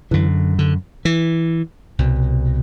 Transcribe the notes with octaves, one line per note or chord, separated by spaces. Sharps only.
F#2 D3 E3
D3
E3
C2 B2